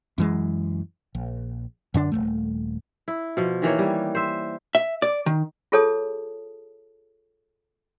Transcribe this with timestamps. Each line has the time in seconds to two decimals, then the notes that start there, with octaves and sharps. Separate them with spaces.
0.18 F#2 E3 G#3
1.15 A#1
1.94 F#2 D3 D4
2.12 D#1 G#2 A3
3.08 E4
3.37 B2 F3
3.62 D#3 E3 A#3 C#5
3.79 G3
4.15 C5 E5
4.75 E5
5.02 D5
5.26 D#3
5.72 F4 G#4 A4 C#5 A5 D#6